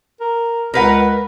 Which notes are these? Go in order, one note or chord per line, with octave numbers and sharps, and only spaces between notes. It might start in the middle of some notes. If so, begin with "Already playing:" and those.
A#4
C#2 A#4 B4 F#5